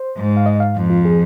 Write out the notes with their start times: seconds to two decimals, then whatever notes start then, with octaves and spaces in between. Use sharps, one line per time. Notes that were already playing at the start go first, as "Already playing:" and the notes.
Already playing: C5
0.17 G#2
0.37 F5
0.46 D#5
0.60 F5
0.75 F2
0.90 F4
1.05 G#4